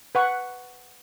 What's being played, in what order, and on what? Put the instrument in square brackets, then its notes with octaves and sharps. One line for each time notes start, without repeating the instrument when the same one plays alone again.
[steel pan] B4 F#5 C#6